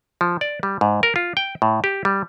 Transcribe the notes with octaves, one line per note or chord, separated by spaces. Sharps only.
F3
D5
G3
G#2
A#4
F4
G5
A2
G4
G3